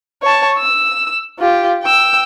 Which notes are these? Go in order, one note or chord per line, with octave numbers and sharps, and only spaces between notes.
C#5 A5
E6
F4 G4
G5 E6